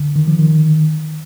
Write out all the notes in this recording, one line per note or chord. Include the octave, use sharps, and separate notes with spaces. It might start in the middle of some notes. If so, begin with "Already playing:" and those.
Already playing: D3
D#3
F3
D#3